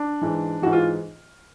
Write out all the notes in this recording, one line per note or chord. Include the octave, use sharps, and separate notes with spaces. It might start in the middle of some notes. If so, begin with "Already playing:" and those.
Already playing: D4
G#2 E3
G#2 E3 F#4
F4